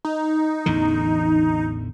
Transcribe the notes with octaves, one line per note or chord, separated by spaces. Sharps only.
D#4
A1 E2 D3